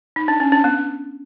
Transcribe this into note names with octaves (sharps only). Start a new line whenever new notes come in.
D#4
D4
C#4
D4
B3